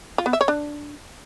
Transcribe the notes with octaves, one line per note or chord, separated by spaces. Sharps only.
F4
B3
E5
C#5
D4